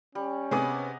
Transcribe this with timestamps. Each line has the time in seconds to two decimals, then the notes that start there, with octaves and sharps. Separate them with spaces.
0.15 G3 C#4
0.51 C3 B3 G#4 C#5 D#5 F#5 D6